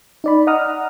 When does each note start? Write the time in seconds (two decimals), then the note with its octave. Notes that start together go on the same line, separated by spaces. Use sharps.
0.24 D#4 D5 B5
0.47 D#5 F#5 A#5 D#6 F6